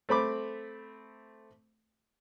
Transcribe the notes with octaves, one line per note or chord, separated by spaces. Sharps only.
A3 C4 B5 D6